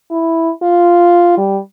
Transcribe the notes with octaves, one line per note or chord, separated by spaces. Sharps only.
E4
F4
G3